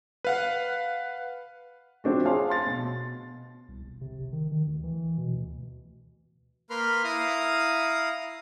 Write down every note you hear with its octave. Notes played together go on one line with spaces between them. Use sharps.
B4 F5 F#5
F3 C4 D4 F#4
G#4 C#5 F5 A5 C6
C6 A6
B2
C2
E1
C3
G1
D#3
D#3
D2
E3
B2
D2
A#3 A#4 B4 B5 C6 F6
E4 F5 A#5 D#6